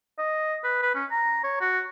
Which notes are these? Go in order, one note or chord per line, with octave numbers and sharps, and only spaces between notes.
D#5
B4
B4
C#4
A#5
C#5
F#4